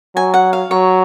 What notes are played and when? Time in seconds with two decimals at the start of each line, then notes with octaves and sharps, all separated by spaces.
0.16 F#3 G#5
0.34 F#5
0.53 F5
0.71 F#3 C#5